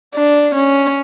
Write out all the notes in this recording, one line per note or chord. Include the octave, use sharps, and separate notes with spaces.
D4
C#4